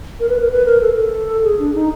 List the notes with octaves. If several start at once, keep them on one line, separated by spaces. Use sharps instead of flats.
A#4
B4
A#4
B4
A#4
A4
A4
G#4
D4
D#4